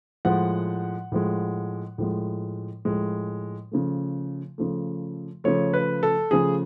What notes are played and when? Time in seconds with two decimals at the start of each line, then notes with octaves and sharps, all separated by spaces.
0.25 A2 F3 G#3 F#5
1.12 A2 F3 G#3
1.98 A2 F3 G#3
2.85 A2 F3 G#3
3.71 C#3 F3 A3
4.58 C#3 F3 A3
5.44 C#3 F3 A3 C#5
5.73 B4
6.03 A4
6.31 C#3 F3 A3 G#4